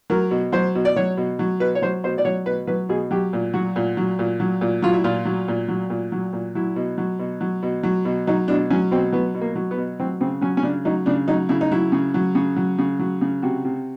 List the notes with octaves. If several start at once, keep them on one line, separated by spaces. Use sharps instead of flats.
F#3 A#4
B2
F#3 C5
B2
D5
F#3 C#5
B2
F#3
B2 B4
C#5
F#3 C5
B2 C5
D5
F#3 C#5
B2 B4
F#3 B4
B2 G#4
F#3 G4
A#2
F#3 F#4
A#2
F#3
A#2
F#3
A#2
F#3 F4
E4
A#2 F4
F#3
A#2
F#3
A#2
F#3
A#2
F#3 E4
B2
F#3
B2
F#3
B2
F#3
B2
F#3 D#4
B2 D4
F#3 C#4
B2 C4
F#3 B3
B2
A#3
F#3
B3
B2
F#3 C4
C#3 C4
F#3 C#4
C#4
C#3 D4
F#3 D#4
C#3 D4
F#3 D#4
C#3 E4
D#4
F#3 E4
C#3
F#3
C#3
F#3
C#3
F#3
C#3
C3 F#4
C3